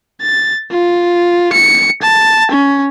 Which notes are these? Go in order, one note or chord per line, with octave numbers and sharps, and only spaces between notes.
A6
F4
C#7
A5
C#4